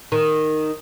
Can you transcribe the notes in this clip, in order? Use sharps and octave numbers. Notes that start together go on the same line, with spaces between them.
D#3